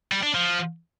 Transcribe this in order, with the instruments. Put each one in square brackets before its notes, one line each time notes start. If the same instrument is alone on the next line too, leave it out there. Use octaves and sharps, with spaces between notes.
[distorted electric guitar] G3
D4
F3